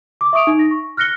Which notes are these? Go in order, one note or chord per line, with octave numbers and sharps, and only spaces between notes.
D6
E5 C#6 D#6 D7 F7
D#4
A#6
C#6
F6 F#6 A#6 C#7 G7